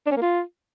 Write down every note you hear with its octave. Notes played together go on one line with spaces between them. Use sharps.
D4
C#4
A#3
F4